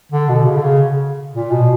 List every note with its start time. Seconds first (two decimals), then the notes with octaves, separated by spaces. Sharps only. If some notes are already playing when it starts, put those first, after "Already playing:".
0.12 D3
0.29 B2
0.45 C#3
0.57 D3
0.63 C#3
1.34 A#2
1.51 B2